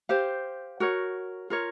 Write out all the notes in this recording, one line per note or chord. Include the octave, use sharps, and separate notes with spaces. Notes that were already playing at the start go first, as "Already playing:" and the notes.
G4 C5 F5
F#4 A#4 C#5
F4 A#4 C#5